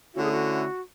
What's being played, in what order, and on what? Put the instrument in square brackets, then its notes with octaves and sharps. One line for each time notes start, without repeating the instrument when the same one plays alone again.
[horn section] D3 A3 C#4 E4 [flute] F#4
[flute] G#4
F#4